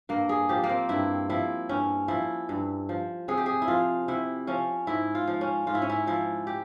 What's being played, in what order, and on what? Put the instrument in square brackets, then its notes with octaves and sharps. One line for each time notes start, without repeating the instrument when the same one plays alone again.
[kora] G2 A#3
G#4
F3 G4
A#3
C4
G2 E4
F3 E4
G2 C#4
F3 E4
G2
F3
C3 G#4
G4
G#4
E4
F3 F4
C3 E4
F3 C#4
G#2 E4
F4
F3
C#4
G#2 F4
E4
C#4
E4
F3 E4
G4